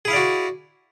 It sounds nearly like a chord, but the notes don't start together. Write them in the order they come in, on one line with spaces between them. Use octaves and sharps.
G#4 E4 F5 D5 F#4